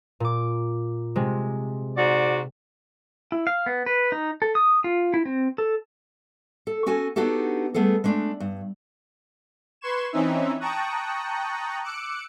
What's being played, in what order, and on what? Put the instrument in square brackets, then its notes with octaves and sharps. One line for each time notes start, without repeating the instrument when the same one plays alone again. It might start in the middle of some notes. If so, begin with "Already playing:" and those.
[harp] A#2 D6
C3 G#3
[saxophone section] G#2 F#4 D5
[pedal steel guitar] E4
F5
B3
B4
D#4
A4
D#6
F4
E4
C4
A4
[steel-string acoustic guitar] A4
C#4 F#4 A4 G#5
B3 D4 D#4 F#4 G4 A4
G3 A3 B3 G#4 A4
G#3 A3 D4
G2
[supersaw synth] B4 C6 C#6 G#6 E7
E3 C4 C#4 D#4 E5
G5 A5 A#5 C#6 D#6 F#6
D6 E6 F#6 C#7 D7